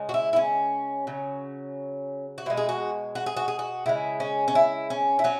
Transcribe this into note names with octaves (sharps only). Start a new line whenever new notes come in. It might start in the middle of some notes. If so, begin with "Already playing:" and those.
Already playing: C#3 G#3
F#4
E4
E4
C#4
C#3 F#3
F#4
B2 G#3 E4
G#4
F#4
F#4
G#4
F#4
G#4
F#4
C#3 G#3 E4
C#4
C#4
E4
C#4
E4
F#3 C#4